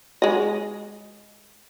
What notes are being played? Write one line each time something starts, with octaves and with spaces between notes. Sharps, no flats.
G#3 D#5